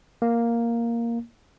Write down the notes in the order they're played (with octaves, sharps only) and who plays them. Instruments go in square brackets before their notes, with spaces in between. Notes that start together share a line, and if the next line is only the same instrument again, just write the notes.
[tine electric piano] A#3